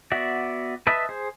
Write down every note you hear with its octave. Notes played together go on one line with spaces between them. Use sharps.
B3 F#4 D5 E5
B4 D#5 E5 A5 B5
G#4 C5